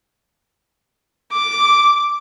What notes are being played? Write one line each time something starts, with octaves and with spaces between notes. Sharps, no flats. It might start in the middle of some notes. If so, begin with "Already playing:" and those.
D6